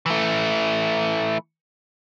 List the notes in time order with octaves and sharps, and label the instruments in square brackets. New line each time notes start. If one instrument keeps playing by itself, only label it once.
[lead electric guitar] E3 A3